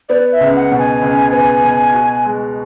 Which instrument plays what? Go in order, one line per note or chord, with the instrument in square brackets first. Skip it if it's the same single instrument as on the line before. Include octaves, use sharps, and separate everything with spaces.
[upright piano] B3 [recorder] D5
[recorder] E5
[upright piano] C#2
[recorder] F#5
[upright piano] B2
[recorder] G#5
[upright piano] C#2
B3
B2
F#4
G#3